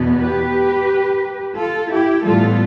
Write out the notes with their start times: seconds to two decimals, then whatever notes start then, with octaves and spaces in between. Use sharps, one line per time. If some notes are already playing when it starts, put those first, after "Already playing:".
Already playing: E2 B2 B3
0.20 G4 B4
1.56 F4 A4
1.91 E4 G4
2.24 A2 E3 G3 B3 F4 A4